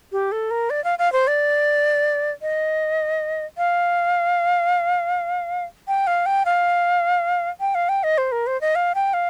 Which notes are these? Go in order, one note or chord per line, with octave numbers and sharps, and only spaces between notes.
G4
A4
A#4
D5
F5
F5
C5
D5
D#5
F5
G5
F5
G5
F5
G5
F5
G5
D#5
C5
A#4
C5
D#5
F5
G5
F5